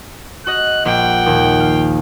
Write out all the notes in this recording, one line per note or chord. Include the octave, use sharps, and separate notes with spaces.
F#4 D#5 F#6
A#1 F#5 G5
D#2 A#2
F5